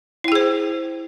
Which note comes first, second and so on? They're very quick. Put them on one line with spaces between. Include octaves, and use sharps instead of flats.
E4 G5 G#4 C5